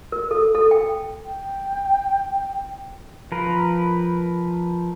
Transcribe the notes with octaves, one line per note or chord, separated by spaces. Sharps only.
A#4
A4
A4
G5
G5
F3 A#4 B4